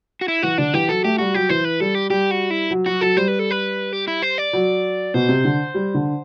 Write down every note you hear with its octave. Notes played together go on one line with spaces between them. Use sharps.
F#4
E4
E3 F#4
D3 D4
E3 G4
F#3 A4
A3 G4
G3 F#4
F#3 G4
E3 C5
B4
G3 A4
G4
G3 G4
F#4
E4
F#3
F#3 F#4
F#3 A4
G3 C5
B4
A4
B4
G4
E4
C5
D5
F#3
B2 C5
C3
D3
G3
D3